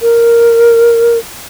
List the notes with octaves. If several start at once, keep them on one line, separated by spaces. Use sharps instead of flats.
A#4